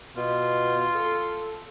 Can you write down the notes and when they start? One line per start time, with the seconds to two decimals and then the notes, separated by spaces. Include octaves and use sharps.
0.17 B2 F4
0.95 A4